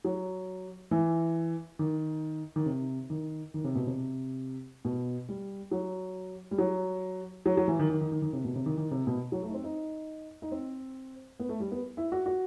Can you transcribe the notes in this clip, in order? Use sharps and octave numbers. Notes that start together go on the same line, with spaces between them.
F#3
E3
D#3
D#3
C3
D#3
D#3
C3
B2
C3
B2
G3
F#3
G3
F#3
F#3
F#3
E3
D#3
D#3
D#3
D#3
D#3
C3
B2
C3
D#3
D#3
C3
B2
F#3
A3
D#4
C4
D#4
D#4
C4
B3
A3
G3
B3
E4
F#4
F#4